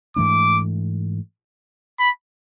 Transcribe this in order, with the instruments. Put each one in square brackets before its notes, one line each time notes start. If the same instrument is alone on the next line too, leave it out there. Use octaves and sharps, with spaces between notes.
[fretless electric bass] G#2 E3 A3 D4 [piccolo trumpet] D6
[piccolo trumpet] B5